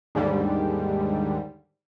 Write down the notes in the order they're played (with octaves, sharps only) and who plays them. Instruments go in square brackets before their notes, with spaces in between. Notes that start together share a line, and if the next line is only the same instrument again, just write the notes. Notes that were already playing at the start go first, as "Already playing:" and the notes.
[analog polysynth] D#2 G#2 D3 G3